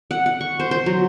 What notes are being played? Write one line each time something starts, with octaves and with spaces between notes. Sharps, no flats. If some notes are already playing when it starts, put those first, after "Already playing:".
F#5
F#5
C#6
C5
C5
F#3